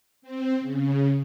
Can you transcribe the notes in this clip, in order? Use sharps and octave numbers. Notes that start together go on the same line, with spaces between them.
C4
C#3